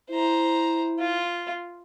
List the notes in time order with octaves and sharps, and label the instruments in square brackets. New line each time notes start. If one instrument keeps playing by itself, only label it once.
[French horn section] E4 [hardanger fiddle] C5 A#5
[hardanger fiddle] F4